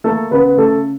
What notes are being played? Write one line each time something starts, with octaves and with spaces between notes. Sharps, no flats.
A3 A#3 A4
C#3 B3 B4
C#3 A3 A4